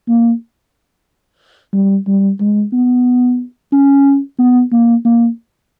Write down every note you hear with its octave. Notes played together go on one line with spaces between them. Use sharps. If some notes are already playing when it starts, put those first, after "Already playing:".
A#3
G3
G3
G#3
B3
C#4
B3
A#3
A#3